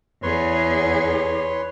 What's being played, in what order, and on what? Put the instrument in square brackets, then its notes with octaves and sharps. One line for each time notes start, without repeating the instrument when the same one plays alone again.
[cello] E2 G#4 [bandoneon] B4 C#5 C6